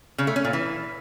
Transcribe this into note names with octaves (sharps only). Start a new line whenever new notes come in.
C#3
A3
C#4
A#2
E3